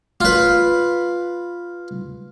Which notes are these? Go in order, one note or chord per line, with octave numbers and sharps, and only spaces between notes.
F4 B4